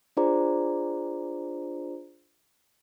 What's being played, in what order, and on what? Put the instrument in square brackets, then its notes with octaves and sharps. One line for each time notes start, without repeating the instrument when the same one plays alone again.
[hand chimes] D4 F4 G#4 C5 D5 A#5